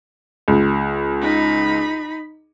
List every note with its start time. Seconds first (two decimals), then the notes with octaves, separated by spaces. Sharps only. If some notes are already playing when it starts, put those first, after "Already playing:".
0.48 C#2
1.21 D#4 B5